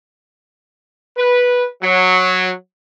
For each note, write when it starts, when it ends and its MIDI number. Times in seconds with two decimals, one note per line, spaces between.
1.18 1.65 71
1.83 2.51 54